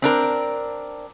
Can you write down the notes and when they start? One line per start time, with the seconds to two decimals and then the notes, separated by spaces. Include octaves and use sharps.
0.02 C4 D4 A#4